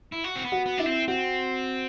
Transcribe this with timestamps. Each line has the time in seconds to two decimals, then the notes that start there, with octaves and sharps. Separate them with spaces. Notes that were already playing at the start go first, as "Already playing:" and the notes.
0.12 E4
0.24 F#4
0.36 C4
0.44 B3
0.52 F#4
0.66 B3
0.78 D4 E4
0.86 C4
1.08 C4 F#4